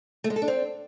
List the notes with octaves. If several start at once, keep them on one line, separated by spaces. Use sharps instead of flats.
A3
G#3
A4
D4
C4